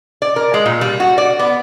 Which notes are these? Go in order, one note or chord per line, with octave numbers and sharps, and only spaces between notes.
D5
A#4
G#3
A#2
G3
F#4
D5
B3